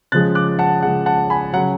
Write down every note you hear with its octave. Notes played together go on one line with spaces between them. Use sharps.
C#3 F3 G#3 F#6 A6
D6 F#6
F#5 A5
C#3 F3 G#3 F#5
F#5 A5
G#5 B5
C#3 F#3 F#5